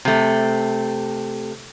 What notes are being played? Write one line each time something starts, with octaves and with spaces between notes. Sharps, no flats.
C3 A3